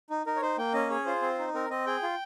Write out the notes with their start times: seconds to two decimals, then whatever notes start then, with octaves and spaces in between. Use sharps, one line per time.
0.10 D#4
0.26 D#4 A#4
0.36 C#5
0.42 D#4 C5
0.58 A#3 G5
0.73 C#4 D#5
0.90 G#4 C#5
1.06 F4 C5
1.22 C4
1.39 D#4
1.54 C4 A#4
1.70 C4 D#5
1.86 G#4 G5
2.03 F4